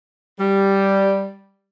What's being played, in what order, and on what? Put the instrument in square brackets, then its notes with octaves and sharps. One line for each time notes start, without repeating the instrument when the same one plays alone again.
[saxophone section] G3